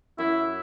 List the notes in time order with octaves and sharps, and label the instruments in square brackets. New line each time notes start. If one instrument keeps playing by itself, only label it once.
[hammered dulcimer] F#2 [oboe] E4